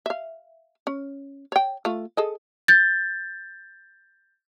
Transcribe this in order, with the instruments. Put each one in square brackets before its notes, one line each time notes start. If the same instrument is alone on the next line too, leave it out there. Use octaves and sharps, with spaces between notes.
[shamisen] E5 F5
C#4
C#5 G5
A3 F4
G#4 A4 D#5
[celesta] G6 A6